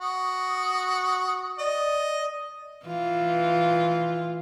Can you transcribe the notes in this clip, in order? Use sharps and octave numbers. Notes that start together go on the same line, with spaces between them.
F#4 D#6
D5 D#5
E3 F4